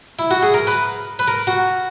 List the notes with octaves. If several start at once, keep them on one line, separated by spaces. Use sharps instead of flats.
E4
F#4
G#4
A#4
B4
B4
A#4
F#4